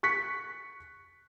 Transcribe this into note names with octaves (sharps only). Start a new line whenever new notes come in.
C#6 F#6 B6 C#7